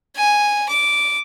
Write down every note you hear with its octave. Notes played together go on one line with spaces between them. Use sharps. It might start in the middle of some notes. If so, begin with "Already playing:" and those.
G#5
D6